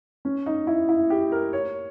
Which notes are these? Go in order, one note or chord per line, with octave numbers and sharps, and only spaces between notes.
C#4
D#4
E4
E4
G4
A#4
C#5